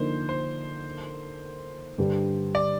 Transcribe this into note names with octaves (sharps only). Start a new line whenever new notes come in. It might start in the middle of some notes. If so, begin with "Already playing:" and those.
Already playing: D3 F3 A#3 D#4 C5
C5
G2 D3 G3
D5